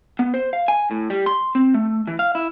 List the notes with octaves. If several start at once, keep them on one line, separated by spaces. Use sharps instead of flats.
B3
C5
F5
G#5
A2
G3
C6
C4
A3
E3
F5
E4